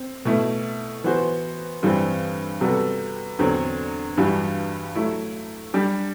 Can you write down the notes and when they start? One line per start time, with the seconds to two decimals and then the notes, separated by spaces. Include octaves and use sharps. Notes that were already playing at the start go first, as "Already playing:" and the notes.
Already playing: C4
0.25 B2 A3 E4
1.04 E3 B3 F#4 C5
1.83 G2 E3 G3 C4
2.61 C3 G3 B3 F#4 A4
3.39 E2 D3 F#3 C4
4.17 G2 E3 G3 D4 F#4
4.95 F#3 A3 E4
5.74 G3 D4 G4